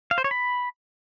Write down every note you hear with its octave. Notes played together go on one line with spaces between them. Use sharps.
F5
C5
C#5
B5